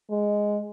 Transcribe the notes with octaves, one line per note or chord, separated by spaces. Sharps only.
G#3